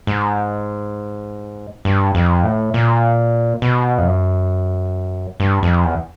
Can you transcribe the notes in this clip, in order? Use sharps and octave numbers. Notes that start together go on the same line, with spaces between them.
G#2
G2
F2
A2
A#2
B2
F2
F#2
G2
F2
E2